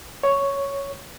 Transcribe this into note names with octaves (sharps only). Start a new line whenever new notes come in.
C#5